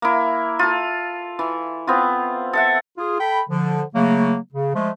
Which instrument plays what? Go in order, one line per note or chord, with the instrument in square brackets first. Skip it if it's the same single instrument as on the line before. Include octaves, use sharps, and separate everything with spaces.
[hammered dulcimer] A#3 E4
F4 A4
E3
B3 C4 F4
A4 E5 F#5
[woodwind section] F4 G#4
A4 G5 B5
D3 F3
C#3 F#3 A3 A#3
C#3
F3 G#3 A3